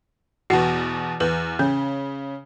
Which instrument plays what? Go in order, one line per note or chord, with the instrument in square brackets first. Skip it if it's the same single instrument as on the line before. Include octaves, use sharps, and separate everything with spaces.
[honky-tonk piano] E2 B2 [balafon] F#4 F#5
[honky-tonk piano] E2 [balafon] B4
[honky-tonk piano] C#3 [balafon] C#4